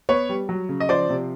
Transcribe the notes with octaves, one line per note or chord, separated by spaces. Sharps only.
B3 B4 C#5
G3
F#3
C#3
D#5
F3 C5 D5
C3